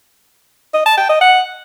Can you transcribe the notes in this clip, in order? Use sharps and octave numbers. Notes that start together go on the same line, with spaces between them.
D#5
A5
G5
D#5
F#5